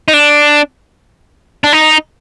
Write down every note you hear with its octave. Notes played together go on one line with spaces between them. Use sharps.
D#4
D4
D4
D#4